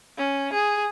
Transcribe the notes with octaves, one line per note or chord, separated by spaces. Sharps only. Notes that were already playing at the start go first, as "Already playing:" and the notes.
C#4
G#4